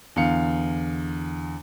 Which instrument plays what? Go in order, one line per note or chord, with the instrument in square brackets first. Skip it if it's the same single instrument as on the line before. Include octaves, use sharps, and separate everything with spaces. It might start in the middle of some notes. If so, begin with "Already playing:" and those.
[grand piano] E2 D3 F5 C#7